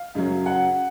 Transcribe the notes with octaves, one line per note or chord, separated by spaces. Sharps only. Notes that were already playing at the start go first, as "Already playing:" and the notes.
Already playing: F5
F#2 C#3 F#3
F#5